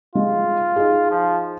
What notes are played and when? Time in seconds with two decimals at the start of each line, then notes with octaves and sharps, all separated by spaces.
0.15 G#3 F4
0.76 D#4 G#4
1.11 F3